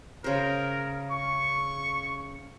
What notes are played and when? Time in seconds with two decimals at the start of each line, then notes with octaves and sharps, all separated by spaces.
0.24 C#3 A#4 C5
1.11 C#6